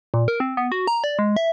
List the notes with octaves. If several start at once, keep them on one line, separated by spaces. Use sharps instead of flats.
A#2
A#4
C4
B3
F#4
A#5
D5
G#3
E5